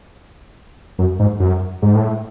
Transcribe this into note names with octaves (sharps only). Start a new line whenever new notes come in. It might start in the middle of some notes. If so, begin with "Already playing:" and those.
F#2
G#2
F#2
G#2
A2